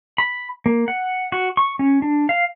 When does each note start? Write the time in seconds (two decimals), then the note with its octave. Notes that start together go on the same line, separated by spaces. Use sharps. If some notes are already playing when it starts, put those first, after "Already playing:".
0.18 B5
0.66 A#3
0.88 F#5
1.32 F#4
1.57 C#6
1.79 C#4
2.02 D4
2.29 F5